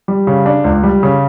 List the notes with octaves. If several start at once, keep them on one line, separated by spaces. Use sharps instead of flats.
G3
C#3
D4
C#2
G3
C#3